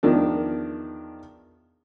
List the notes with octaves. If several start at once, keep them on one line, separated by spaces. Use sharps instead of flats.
E2 D#3 F3 D4